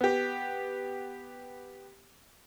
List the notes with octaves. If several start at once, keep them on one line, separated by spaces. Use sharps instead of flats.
B3 G4